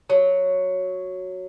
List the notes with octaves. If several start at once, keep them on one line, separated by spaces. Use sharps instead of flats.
F#3